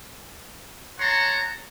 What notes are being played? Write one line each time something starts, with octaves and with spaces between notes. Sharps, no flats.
C#5 F#5 A5 A#5 C6